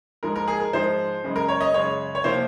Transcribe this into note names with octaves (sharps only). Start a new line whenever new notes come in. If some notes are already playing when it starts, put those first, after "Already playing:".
G#2 F3 G#3 A#4
A#4
G#4
A#4
G#2 F3 G#3 C5
F#2 C#3 G#3
A#4
C#5
D#5
F#2 C#3 G#3 C#5
C#5
C3 F3 A#3 C5